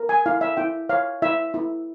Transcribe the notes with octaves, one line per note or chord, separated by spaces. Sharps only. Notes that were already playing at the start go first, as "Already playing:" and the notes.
Already playing: A#4
G#5
E4 F5
E5
E4 G5
C#5 F5
E4 E5
E4